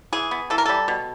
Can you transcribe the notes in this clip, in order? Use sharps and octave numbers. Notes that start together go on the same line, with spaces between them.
E3 G#4
B3
E3 A4
A#4
G3 A4
B2